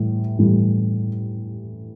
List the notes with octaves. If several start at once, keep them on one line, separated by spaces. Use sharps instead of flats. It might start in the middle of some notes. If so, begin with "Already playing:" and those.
Already playing: A2 E3 G3
A2 E3 G3